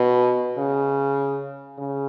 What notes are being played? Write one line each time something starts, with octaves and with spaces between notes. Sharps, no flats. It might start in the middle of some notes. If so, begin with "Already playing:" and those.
Already playing: B2
C#3
C#3